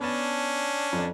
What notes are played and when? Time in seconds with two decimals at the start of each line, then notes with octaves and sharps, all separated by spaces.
0.01 B3 C#4 D4 A5
0.93 F2